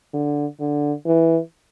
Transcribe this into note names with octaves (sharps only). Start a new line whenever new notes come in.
D3
D3
E3